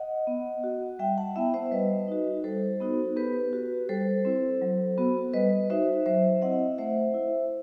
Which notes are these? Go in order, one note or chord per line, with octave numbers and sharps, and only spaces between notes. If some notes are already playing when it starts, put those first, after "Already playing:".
Already playing: D#5 F#5
B3
F#4
G3 E5 G5
F#5 A5
B3 E4 E5 G5
C5 E5
G3 B4 D#5
D#4 F#4
G3 A4 C5
B3 D#4 F#4
B3 G4 B4
F#4
G3 A4 C5
C4 E4
F#3
B3 F#4
G3 B4 D#5
D#4 F#4 C5 E5
F#3 C5 E5
C4 E4 D#5 F#5
A3 C5 E5
E4